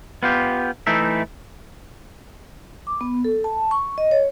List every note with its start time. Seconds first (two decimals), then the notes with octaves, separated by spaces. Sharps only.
0.23 B3 F4 G4
0.87 E3 A3 D#4 E5
2.87 D6
3.01 B3
3.25 A4
3.44 A5
3.71 C#6
3.98 D#5
4.11 C#5